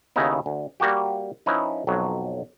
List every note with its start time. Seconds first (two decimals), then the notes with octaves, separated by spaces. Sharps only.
0.16 D#2 C#3 B3 D#4 E4
0.46 D2
0.80 G3 A#3 F#4 G4
1.46 F3 C#4 D#4 E4 B4
1.87 B1 F2 F#3